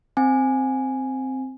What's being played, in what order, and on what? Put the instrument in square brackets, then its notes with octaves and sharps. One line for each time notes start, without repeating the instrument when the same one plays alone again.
[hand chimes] C4 G#5